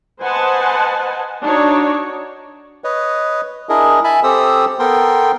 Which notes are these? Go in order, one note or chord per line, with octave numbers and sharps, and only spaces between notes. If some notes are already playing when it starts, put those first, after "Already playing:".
B4 C5 D#5 F#5 G#5 A5
D4 D#4 F#4 C#5
B4 C#5 D#5
D4 E4 G#4 A#4 D#5
E5 G#5 A5 B5
C4 G4 A4 C5 D#6 E6
B3 A4 A#4 G5 C6